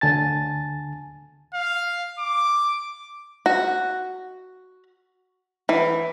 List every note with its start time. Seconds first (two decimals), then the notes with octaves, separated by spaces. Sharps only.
0.01 D2 D3 G#5 A5 A6
1.54 F5
2.19 D6
3.46 F#4
5.69 E3